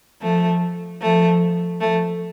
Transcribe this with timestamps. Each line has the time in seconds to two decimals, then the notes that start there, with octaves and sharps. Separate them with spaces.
0.22 F3 A3
1.01 F3 A3
1.80 F3 A3